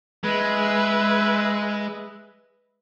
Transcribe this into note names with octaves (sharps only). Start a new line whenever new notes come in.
G#3 B4 E5